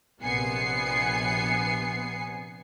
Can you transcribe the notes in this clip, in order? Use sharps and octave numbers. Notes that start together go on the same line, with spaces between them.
A#1 C3 B3 G#5 C7 C#7